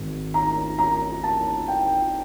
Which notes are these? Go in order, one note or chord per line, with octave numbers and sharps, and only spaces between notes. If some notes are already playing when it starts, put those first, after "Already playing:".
Already playing: G#1 G#2
A#5
A#5
A5
G5